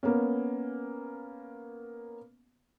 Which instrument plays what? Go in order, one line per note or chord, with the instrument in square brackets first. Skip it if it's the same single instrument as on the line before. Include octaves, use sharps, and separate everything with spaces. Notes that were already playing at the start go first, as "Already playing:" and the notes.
[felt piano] A#3 B3 C#4